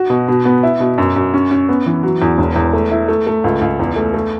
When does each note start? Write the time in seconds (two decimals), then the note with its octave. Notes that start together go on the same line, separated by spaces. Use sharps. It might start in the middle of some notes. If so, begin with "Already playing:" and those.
Already playing: F#4
0.10 B2
0.28 B2
0.45 B3
0.63 E4
0.80 B2
0.98 F#2
1.16 F#2
1.34 C#4
1.51 C#4
1.69 B3
1.86 E3
2.03 F#3
2.22 E2
2.38 E1
2.56 E2
2.73 A3
2.92 E4
3.08 A3
3.27 A3
3.44 C#2
3.61 C#2
3.79 E2
3.96 A3
4.14 A3